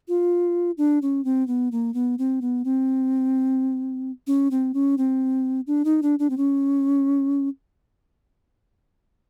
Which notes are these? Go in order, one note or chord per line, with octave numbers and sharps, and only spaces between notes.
F4
D4
C#4
C4
B3
A#3
B3
C4
B3
C4
C#4
C4
C#4
C4
D4
D#4
D4
D4
C4
C#4